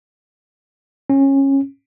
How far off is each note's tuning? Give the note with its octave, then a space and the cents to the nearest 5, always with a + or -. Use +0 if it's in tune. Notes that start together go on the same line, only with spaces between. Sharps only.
C#4 -20